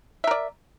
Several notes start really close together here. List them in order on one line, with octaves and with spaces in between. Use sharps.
E5 A#4 D5